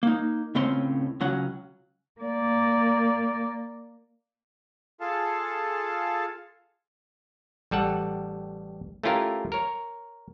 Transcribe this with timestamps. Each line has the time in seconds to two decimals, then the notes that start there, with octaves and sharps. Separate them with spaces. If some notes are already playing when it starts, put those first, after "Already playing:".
0.03 A#3 D#4
0.55 C#2 A2 C4 C#4 C6
1.20 C#2 F#3 C#4 F#5
2.21 A#3 D5
5.01 F4 G#4 A4 F5 A5
7.71 A1 G3 A4 F#5
9.03 A3 C#4 E4 F4 G4 A#4
9.52 A#4 C#5